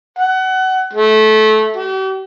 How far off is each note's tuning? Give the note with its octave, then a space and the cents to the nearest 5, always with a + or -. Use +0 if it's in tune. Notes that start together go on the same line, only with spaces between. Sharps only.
F#5 +25
A3 -20
G4 -45